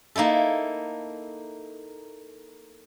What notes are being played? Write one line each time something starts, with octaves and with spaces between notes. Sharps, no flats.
A#3 D#4 E4 A4